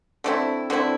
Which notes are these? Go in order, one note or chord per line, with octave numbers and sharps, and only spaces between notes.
D3 A3 C4 E4
D3 A3 C4 E4